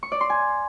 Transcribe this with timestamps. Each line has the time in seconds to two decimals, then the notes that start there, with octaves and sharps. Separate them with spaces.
0.03 C#6
0.12 D5
0.21 C6
0.30 G#5